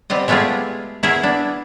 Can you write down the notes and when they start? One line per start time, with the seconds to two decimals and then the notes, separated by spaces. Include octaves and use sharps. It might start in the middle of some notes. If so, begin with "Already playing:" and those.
0.10 G3 B3 C4 D#5
0.28 G#3 A3 B3 F4 G4 G#4
1.03 B3 E4 F#4 G#4 A#4
1.23 B3 D4